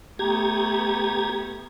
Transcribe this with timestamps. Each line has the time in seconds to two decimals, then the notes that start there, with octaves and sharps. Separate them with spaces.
0.19 A3 B3 G4 A#5 G#6